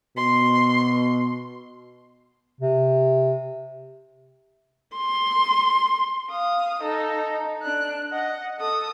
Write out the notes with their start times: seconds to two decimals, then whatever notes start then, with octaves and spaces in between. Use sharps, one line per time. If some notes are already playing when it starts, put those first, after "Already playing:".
0.17 B2 C6
2.61 C3
4.97 C6
6.31 F5 D#6
6.82 D#4 A4
7.63 D4 F#6
8.10 D#5 F#5
8.59 A4 D#6